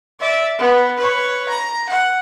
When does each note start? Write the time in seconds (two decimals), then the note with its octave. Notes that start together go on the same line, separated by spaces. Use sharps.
0.20 D5 E5
0.58 B3
0.97 B4 C#5
1.48 A#5
1.89 F#5